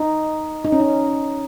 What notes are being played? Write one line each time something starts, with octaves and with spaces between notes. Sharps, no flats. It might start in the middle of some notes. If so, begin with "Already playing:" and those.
Already playing: D#4
D#4
C#4
D#4